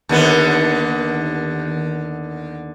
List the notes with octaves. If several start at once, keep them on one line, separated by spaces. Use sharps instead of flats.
D#2 D3 B3